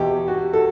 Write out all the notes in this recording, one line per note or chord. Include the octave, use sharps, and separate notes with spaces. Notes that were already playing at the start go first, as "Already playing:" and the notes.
Already playing: E2 B2 G4
F#4
A4